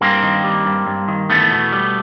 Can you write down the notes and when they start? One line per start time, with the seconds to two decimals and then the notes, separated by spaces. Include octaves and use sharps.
0.01 G2 A#3 C4
0.23 D#3
0.44 G3
0.65 G2
0.87 G2
1.08 D#3
1.30 E2 A3 B3
1.51 B2
1.73 G3